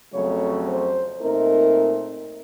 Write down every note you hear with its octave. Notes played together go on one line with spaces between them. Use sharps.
F2 C#3 F#3 A3 C#5
C5
A#2 A3 C4 D#4 A#4